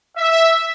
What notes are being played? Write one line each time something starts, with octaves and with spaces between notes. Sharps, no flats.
E5